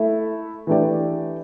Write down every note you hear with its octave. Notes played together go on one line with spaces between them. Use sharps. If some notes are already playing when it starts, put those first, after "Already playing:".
Already playing: A3 E4 A4
E3 A3 D4 G4 D5